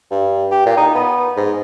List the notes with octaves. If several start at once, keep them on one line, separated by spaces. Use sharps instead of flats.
G2
G4
A#2
D#4
B3
G#2